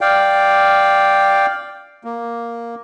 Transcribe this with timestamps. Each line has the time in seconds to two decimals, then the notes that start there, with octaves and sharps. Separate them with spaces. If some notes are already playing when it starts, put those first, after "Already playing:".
0.01 D5 F5 G5
2.04 A#3